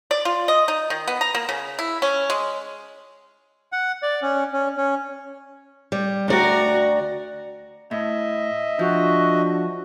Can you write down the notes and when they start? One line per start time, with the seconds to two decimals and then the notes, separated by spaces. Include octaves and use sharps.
0.11 D5
0.25 F4
0.48 D#5
0.68 D#4
0.90 D#3
1.08 B3
1.21 A#5
1.35 A#3
1.49 C#3
1.79 E4
2.02 C#4
2.30 G#3
3.72 F#5
4.03 D5
4.22 C#4
4.53 C#4
4.77 C#4
5.92 G3
6.28 D2 F#4 D5 G5 A#5
7.91 A2 D#5 E5
8.79 F3 D4 F#4